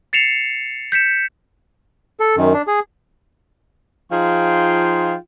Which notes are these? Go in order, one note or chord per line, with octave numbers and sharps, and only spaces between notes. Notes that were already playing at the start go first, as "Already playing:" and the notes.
A6 C7 C#7 E7 F7
G6 B6 C#7 E7
A4
F#2 D#3
D4
G#4
F3 D#4 F4 G#4 G5 C6